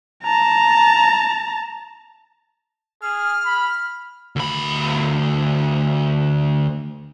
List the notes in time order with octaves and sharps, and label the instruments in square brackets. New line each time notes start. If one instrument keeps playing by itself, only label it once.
[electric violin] A5 A#5
[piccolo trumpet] G#4 [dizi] F6
[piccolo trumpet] B5
[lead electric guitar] D2 B5